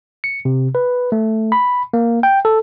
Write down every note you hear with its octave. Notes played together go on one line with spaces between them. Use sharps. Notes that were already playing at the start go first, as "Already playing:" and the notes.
C#7
C3
B4
A3
B5
A#3
G5
A4